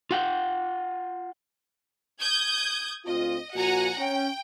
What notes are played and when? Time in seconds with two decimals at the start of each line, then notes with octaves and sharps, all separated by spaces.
0.11 F4 F#5 G5
2.18 D#6 G6 G#6
3.05 D2 C4 F4 D#5
3.54 A#2 F3 F#4 F#5 G#5 A#5
3.97 C#4 G5